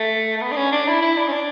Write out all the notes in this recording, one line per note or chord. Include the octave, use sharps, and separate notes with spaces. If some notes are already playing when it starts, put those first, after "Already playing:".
Already playing: A3
A3
B3
D4
C#4
D4
E4
E4
D4
C#4
D4